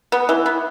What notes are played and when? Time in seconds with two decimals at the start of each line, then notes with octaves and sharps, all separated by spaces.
0.12 B3
0.29 E3
0.46 B3